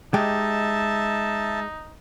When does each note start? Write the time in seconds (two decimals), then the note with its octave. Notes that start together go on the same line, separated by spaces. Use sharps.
0.14 G#3 D#4 G4 E5 A5